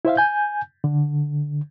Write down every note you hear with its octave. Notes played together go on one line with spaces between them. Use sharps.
E4 C5 E5 F5
G#5 G6
D3